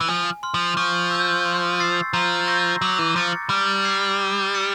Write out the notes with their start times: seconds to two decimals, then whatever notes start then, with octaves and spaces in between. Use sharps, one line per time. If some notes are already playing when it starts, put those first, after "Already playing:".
0.01 E3
0.08 F3 G#5
0.43 C6 F6
0.54 F3
0.77 F3 C#6
1.11 E6 G6
1.45 C6
1.79 E6 A6 C7
2.13 F3 A#5
2.47 C#6 E6 G6 A#6
2.82 F#3 D6
2.99 E3
3.16 F3 F#6 A6 C#7
3.50 G3 F6
3.84 G#6 C7 F7
4.18 E6
4.53 A6 C#7 E7